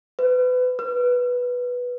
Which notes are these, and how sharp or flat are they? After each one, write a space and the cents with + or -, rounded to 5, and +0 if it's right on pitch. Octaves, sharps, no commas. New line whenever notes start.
B4 +30
B4 -5